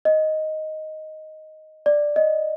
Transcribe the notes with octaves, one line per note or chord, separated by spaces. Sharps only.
D#5
D5
D#5